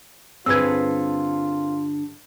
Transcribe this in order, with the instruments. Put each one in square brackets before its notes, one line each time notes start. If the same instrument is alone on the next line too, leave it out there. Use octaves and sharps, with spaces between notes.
[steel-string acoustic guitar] G2 D3 [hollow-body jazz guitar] C4 G#4 B4 [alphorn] F4 [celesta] E6 G#6